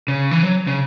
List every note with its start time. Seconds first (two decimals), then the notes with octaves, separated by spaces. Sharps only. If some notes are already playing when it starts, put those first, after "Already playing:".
0.08 C#3
0.31 E3
0.43 F#3
0.67 C#3